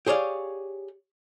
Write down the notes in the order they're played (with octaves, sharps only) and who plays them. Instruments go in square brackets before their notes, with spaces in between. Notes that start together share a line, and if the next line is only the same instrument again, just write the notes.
[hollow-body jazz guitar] G4 G#4 C#5 D5 F5